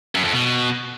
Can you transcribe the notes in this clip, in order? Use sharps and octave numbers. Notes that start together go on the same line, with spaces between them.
F#2
F2
B2